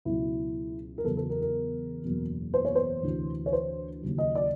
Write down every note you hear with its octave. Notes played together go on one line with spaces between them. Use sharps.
C#2 B2 F#3 E4
A#4
E2 C#3 F#3 A4
A4
A#4
A#4
F#1 E2 B2 F#3
C5
C#5
C5
D2 C3 E3
C#5
C5
D#2 C#3 F#3
D#5
D5